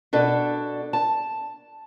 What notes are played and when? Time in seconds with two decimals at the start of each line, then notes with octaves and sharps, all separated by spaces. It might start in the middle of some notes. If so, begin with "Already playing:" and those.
0.13 B2 D4 A4
0.93 A5